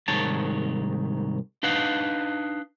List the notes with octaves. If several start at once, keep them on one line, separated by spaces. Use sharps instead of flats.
C2 G#2 D#3 C#5 A5
D4 D#4 B4 F5 F#5